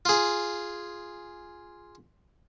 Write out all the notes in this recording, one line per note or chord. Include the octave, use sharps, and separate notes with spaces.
F4 G#4